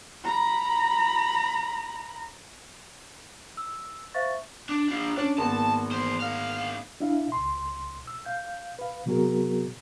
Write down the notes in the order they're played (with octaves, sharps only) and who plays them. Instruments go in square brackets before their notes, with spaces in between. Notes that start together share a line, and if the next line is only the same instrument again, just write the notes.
[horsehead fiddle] A#5 B5
[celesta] E6
C5 E5 F5 C#6 A6
[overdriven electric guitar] D4
D4 F4
[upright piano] C#4 [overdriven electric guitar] D4
[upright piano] G#1 A#3 B3 [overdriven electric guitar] A5
[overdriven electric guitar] E2 C5
D2 F5
[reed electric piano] D4 E4 E5 F5
C#2 C6
E6
F5 G6
B4 F5
C3 F#3 B3 F#4 G#4 A#4